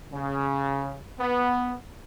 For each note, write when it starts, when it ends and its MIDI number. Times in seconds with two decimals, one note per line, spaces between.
0.12 0.96 49
1.18 1.74 59